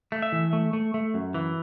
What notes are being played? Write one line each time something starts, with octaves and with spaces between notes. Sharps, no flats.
A3
E5
E3
A3
A3
A3
F#2
E3